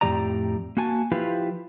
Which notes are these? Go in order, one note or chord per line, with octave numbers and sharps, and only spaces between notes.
F2 A2 E3 G4 D5 A#5
A#3 F#4 G#5 A5
F3 E4 F4 G4 B4 F5